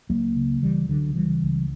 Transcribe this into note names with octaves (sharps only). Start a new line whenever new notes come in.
C#2 F#3 A#3
C#3
C#2 E3 G3
C#2 D3 F#3
C#3 E3 G3
C#2